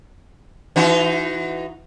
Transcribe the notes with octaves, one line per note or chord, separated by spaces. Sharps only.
E3 D#4 F#4